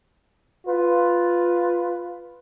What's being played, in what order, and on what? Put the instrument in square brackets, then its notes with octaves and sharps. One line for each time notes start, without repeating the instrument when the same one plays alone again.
[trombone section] F4 B4